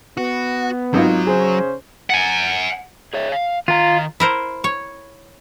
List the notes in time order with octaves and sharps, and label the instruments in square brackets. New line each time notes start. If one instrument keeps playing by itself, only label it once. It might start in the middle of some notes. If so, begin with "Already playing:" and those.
[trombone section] B3 [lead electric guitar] F#4
[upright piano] G#1 D#4 F4 [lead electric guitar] F#3
[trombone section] C#3 C#4 C5 [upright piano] G#4
[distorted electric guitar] F#5 G#5
[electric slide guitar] G#4 C#5 E5
F5
[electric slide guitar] D#3 A#5 [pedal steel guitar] F4
[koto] E4 A#4 C5
C#5